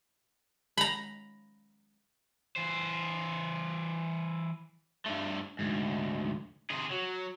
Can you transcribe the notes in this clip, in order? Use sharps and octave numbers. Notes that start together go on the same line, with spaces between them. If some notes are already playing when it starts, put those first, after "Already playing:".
A#5 B5
E3 C5
G2 A3
D2 G#2
C3 G#4
F#3